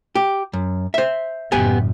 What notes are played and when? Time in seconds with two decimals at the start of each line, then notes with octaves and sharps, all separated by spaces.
0.15 G4
0.53 F#2
0.94 C5 E5
1.52 F#1 A2 B3 G4 G#5